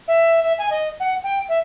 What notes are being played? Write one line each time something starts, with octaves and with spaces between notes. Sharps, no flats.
E5
E5
G#5
D#5
F#5
G5
E5